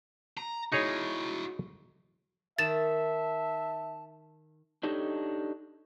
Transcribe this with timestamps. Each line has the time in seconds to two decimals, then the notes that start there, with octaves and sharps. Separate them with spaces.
0.38 A#5
0.72 D#4 E4 F#4 G#4 C#5
2.59 D#3 E5 A5 A6 E7
4.83 D4 D#4 G4 A4 C#5 D#5